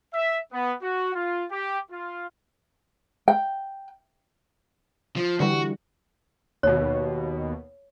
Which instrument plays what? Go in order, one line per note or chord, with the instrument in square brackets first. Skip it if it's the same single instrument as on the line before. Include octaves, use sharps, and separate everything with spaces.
[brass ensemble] E5
B3
F#4
F4
G4
F4
[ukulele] G5
[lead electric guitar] F3
[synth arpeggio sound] D3 E3 G3 [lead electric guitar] F#4
[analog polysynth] D#2 B2 [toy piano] C#5